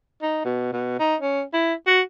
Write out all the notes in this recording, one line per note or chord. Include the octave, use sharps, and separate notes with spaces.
D#4
B2
B2
D#4
C#4
E4
F#4